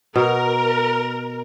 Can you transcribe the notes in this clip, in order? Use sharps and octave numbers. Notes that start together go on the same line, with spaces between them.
B2 A#4